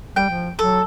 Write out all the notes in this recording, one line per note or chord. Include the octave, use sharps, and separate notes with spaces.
G3 G5
F3
F#3 A4 A5 E6